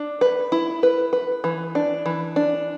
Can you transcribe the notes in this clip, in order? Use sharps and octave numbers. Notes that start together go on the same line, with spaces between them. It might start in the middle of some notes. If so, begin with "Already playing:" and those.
Already playing: D4
B4
E4
B4
B4
E3
D4
E3
D4